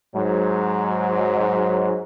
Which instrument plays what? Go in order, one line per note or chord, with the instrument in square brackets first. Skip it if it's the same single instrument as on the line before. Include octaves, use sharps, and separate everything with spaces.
[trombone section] G#2 F#3